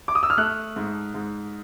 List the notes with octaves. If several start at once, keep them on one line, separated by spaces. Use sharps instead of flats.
D6
D#6
E6
F6
A3 F#6
G#2
G#2